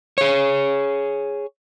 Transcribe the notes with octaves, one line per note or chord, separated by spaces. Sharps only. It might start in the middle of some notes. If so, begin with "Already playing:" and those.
G#4 C#5